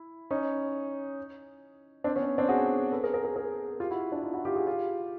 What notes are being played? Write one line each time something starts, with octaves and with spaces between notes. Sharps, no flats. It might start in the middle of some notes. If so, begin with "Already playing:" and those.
Already playing: E4
C#4 D#4
C4 D4
B3 C#4
C4 D4
F#4 G#4
A4 B4
G#4 A#4
G#4 A#4
G#4 A#4
G#4 A#4
F4 G4
E4 F#4
D4 E4
D#4 F4
E4 F#4
F4 G4
F#4 G#4
F4 G4